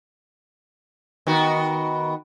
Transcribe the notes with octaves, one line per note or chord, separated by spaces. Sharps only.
D#3 B3 F#4